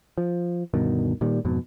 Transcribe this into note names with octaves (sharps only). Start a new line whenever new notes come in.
F3
D2 G2 B2 D#3
A#2 D#3 G3
F2 G#2 B2